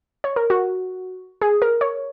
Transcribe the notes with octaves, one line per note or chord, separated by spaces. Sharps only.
C#5
A#4
F#4
G#4
A#4
C#5